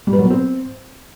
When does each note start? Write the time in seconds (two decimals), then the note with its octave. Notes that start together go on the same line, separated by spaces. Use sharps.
0.07 G3
0.13 B4
0.19 F#3
0.25 B3
0.30 C4